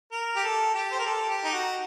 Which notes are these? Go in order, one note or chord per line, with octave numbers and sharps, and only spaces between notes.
A#4
G4
A4
G4
C5
A#4
A4
G4
D#4
F#4